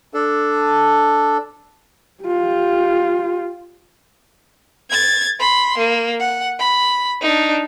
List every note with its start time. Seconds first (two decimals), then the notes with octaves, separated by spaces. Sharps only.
0.14 D4 A4
2.24 F4 G4
4.91 G#6 A6
5.40 B5 C6
5.78 A#3
6.20 F#5
6.59 B5
7.21 D4 D#4